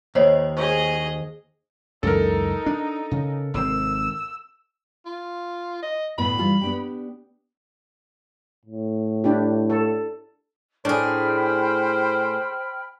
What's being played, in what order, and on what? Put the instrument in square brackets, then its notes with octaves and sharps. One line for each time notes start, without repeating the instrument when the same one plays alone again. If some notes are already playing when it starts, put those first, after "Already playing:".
[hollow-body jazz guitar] D#2 [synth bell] C5 C#5 D#5
[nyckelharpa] G#4 D#5 [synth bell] C5
[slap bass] C#2 F#2 E3 [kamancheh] D#4 [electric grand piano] A4 A#4
[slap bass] D4
C#3
[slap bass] G#1 C3 C4 [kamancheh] E6
[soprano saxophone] F4
D#5
[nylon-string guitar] D2 A2 B3 [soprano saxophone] B5
[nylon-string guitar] E3 G3 F4
B3 D4 G4
[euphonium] A2
[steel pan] D4 E4 G4
A4
[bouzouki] A2 G#4 [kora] D4 [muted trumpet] C5 [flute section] G5 B5 F6